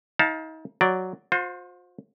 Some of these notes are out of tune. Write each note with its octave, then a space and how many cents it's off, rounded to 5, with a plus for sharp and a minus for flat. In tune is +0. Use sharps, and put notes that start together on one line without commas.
D#4 +40 F5 +25 A5 +0
F#3 +0 D5 +0
F4 +45 C5 +5